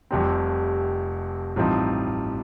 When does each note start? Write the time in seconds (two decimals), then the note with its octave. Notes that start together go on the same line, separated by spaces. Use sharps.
0.11 F1 F2 C3 G3 C4
1.56 A1 G2 F3 C4 D#4